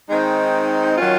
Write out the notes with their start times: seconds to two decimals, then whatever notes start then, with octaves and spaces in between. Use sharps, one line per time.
0.09 D#3 G#3 C4 D#4
0.96 D#3 F#3 C#4 F4